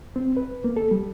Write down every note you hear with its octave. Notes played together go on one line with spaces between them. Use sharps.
C4
B4
A#3
A4
G3